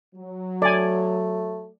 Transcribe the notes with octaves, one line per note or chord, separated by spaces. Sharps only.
F#3
A3 D5 G#5